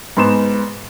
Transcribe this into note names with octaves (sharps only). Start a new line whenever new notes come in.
G#2 B3 C6 E7